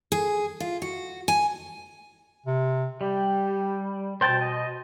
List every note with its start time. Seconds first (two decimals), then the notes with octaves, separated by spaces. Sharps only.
0.12 G#4
0.60 F4
0.82 F#4
1.28 G#5
2.46 C3
3.01 G3 G4
4.21 B2 C5 G5 A5
4.41 D#5